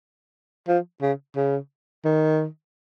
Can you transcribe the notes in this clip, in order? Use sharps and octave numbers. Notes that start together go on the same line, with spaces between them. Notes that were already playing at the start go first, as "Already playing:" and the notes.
F3
C#3
C#3
D#3